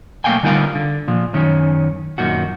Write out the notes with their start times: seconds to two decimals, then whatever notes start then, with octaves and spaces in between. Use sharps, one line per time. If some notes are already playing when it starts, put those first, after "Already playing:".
0.24 B1 A3 A#3 F5 G5 G#5
0.43 D3 G3 D#4 F4 A#4 F5
0.75 D3
1.08 A#2 F3
1.33 F#2 D#3 C#4
2.18 F#2 A#2 D#3 F#4